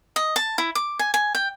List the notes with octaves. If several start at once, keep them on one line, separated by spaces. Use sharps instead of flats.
D#5
A5
E4
D6
G#5
G#5
G5